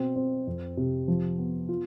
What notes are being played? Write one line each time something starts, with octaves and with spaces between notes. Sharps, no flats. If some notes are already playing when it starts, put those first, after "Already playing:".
Already playing: B2 C4
C4
F2
C3
F3
B3
F4